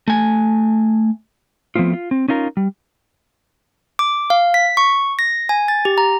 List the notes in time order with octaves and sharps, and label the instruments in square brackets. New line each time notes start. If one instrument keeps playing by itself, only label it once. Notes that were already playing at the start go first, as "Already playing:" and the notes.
[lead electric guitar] A3 G#5
[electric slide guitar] F3 A3 B3 C4 F4
F4
C4
C#4 D#4 F4 A#4
G3
[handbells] D6
F5
B6
C#6
A#6
G#5
A6
G4
A#5